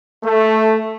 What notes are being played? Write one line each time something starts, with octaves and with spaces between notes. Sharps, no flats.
A3